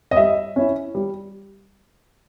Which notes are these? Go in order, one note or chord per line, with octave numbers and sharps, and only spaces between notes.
D#5
G3 E5
C#4 E4
G3